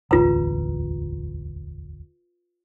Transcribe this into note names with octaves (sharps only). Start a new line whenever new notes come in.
E1 A1 D2 F4 B4 A#5